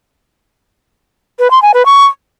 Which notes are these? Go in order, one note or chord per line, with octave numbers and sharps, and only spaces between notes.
B4
C6
G#5
B4
C#6